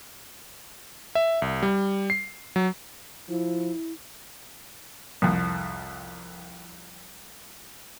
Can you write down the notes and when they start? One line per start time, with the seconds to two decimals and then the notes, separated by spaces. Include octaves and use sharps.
1.15 E5
1.42 C2
1.63 G3
2.10 C7
2.56 F#3
3.29 F3 E4
5.22 C2 F2